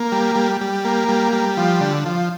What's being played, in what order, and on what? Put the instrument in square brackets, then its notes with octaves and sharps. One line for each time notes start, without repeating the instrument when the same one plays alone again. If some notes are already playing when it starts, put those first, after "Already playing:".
Already playing: [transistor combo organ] A#3
G3
G3
G3
A#3
G3
G3
F3
D3
F3